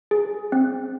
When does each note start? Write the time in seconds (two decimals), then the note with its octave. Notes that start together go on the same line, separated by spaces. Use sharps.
0.11 G#4
0.52 C4